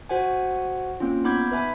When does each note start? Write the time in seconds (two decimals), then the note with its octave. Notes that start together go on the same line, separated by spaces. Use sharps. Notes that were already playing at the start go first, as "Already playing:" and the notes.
0.09 F#4 C5 F#5 G#5
1.00 A#3 C4 C#4 F4
1.24 B3 D#4 B5 D6 G6 G#6
1.52 B4 E5 G#5 B5